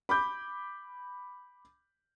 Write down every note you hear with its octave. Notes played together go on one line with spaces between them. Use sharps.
B5 D6 G6